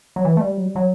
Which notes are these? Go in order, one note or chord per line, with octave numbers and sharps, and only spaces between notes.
F#3
E3
A3
G3
F#3
G3
F#3